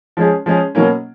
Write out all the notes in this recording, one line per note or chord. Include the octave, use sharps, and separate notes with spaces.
F3 G#3 C#4 G#4
F3 G#3 C#4 G#4
B2 F#3 A#3 C#4